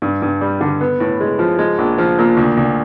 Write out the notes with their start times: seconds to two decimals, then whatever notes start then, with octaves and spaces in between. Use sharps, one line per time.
0.02 G2
0.22 G2
0.41 G3
0.61 D3
0.81 B3
1.00 A2
1.20 G#3
1.39 F3
1.59 G#3
1.78 A#1
1.98 F3
2.19 A#2
2.37 D2
2.57 D2